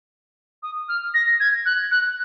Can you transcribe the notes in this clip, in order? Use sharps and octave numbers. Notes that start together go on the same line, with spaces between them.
D#6
F6
A#6
G#6
F#6
F#6